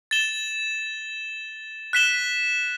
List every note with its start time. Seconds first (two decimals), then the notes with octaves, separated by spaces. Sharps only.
0.11 A6 E7 G7
1.93 F#6 B6 E7 G7